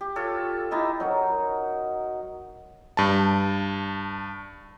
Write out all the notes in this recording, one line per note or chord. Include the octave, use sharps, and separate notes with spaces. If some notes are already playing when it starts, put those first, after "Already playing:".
G4
F4 A4 C#5
D#4 E4 G4 D#5
F#3 D#4 A#4
G2 A5